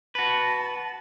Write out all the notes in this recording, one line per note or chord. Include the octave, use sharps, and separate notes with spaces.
F#4 B4 A5